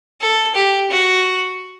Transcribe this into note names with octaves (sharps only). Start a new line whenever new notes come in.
A4
G4
F#4